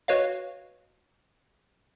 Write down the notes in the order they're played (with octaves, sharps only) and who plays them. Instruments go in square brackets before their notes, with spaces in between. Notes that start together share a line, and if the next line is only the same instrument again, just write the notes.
[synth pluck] F#4 B4 C#5 D#5 F5